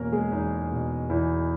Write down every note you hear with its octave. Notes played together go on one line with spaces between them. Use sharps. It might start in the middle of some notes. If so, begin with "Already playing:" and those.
Already playing: E2 B2 A#3 C#4 A#4
G#3 G#4
E2 D#4
B2
E2 E4